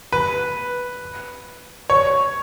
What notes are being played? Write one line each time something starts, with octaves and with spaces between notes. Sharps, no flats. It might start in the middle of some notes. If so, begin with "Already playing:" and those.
B4
C#5